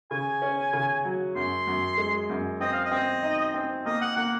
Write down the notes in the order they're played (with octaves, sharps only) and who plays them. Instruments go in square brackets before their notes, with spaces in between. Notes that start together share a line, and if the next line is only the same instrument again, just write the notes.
[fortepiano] C#3 [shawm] G#5
[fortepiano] C#4
C#3
F#3
[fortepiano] F#2 [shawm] C6
[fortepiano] F#2
G#3
F#2
[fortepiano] C4 [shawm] D#5
[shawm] F5
D#5
[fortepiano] C4
D#4
C4
[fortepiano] A#3 [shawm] D#5
[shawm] F#5
[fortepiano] A#3 [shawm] F#5